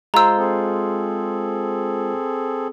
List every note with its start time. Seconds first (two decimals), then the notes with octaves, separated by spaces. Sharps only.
0.14 G#3 F4 C5 A#5 E6
0.38 C4 G#4 A4